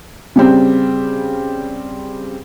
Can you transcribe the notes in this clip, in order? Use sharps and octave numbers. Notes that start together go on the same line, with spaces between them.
C#3 G3 C4